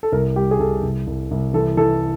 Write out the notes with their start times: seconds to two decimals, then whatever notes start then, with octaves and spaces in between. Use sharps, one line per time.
0.03 A4
0.12 C2 A#4
0.36 G3 G4
0.51 G#4
0.59 C2 A4
0.83 C2
1.07 C2
1.31 C2
1.54 E3 A4
1.77 E3 A4